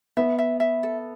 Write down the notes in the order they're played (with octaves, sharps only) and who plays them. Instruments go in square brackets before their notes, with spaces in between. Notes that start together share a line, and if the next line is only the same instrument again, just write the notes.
[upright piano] B3 [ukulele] E5
[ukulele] E5
E5
A4